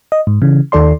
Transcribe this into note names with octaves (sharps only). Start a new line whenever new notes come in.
D#5
G#2
C#3 E3
D#2 D#3 A4 D5 C6